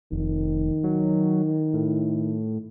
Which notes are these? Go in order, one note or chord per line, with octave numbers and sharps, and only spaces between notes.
F1 D#3
F#3
A2